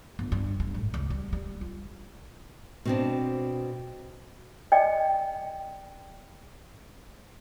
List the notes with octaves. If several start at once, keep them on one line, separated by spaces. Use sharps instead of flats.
G1
G2
G2
A1
C#2
G3
G3
F4
B2 C4 D4
D5 D#5 G5